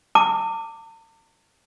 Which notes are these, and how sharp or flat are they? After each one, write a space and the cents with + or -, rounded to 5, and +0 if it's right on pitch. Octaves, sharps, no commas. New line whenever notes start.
A5 +45 D6 +0